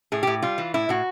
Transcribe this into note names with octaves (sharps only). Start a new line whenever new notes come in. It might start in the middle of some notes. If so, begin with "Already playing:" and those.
A2 G#4
A2 G4
G3 F4
E3
A2 E4
A2 F#4